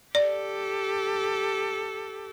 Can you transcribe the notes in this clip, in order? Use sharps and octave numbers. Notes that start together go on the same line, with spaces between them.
G4 A4 D5